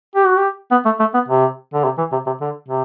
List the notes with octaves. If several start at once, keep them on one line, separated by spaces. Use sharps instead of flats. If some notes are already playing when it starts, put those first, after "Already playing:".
G4
F#4
G4
B3
A3
A3
B3
C3
D3
C3
E3
C3
C3
D3
C3